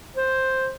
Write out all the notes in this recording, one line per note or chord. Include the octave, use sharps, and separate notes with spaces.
C5